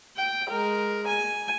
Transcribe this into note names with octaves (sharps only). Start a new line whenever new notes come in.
G5
G#3 A#4
G#5